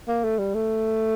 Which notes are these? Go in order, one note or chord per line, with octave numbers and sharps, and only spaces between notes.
A#3
A3
G3
A3